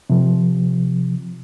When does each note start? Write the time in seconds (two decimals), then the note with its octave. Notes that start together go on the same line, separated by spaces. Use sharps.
0.10 C3 F3